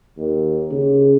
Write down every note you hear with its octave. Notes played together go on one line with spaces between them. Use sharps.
D#2
C#3